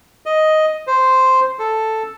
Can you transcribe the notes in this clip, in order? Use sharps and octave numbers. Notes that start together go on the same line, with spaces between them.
D#5
C5
A4